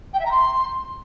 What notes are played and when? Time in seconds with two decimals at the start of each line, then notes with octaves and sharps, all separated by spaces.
0.13 G5
0.19 E5
0.25 A#5
0.31 C6